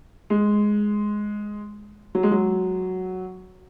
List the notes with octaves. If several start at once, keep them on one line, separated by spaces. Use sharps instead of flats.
G#3
F#3
G#3
F#3